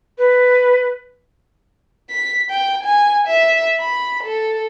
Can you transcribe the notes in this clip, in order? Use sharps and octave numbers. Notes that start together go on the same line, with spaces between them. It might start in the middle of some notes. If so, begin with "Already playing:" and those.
B4
B6
G5
G#5
E5
B5
A4